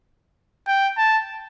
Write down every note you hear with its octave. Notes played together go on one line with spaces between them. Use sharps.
G5
A5